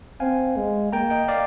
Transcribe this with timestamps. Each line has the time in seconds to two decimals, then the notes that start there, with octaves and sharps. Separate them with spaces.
0.20 C4 F5 G#5
0.57 G#3
0.93 A#3 G5 A#5
1.10 D#5 G5
1.28 D5 F5